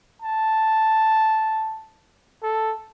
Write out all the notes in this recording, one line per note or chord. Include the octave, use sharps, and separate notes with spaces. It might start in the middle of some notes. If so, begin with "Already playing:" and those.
A5
A4